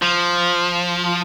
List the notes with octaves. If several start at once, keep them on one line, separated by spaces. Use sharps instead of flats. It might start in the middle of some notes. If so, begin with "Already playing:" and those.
F3